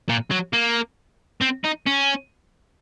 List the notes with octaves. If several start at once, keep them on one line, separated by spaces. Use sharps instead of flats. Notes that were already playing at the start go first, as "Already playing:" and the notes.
A#2
F#3
A#3
C4
D#4
C#4